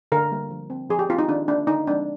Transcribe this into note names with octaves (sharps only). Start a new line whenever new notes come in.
D3 A#4
G3 A#3
F3
C4
F3 G#4
G4
C4 F4
D#4
D#3 D4
A#3 D4
D3 D#4
F3 G#3 C4 D4